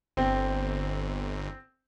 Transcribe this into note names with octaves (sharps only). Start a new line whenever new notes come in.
G1 C4